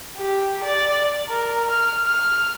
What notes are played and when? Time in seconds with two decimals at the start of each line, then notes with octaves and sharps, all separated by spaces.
0.16 G4
0.63 D5
1.29 A#4
1.70 F6
2.06 F6